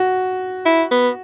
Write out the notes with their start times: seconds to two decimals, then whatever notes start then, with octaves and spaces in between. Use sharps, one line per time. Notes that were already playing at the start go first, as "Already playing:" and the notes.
Already playing: F#4
0.66 E4
0.91 B3